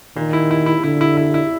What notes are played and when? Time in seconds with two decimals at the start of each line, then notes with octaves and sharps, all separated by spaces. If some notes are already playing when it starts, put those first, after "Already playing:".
0.16 A#2 D#3
0.33 E4
0.51 E4
0.66 E4
0.83 D3 E4
1.01 E4
1.17 E4
1.34 E4